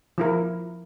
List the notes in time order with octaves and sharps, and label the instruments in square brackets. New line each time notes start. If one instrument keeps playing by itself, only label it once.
[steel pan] F3 E4 A#4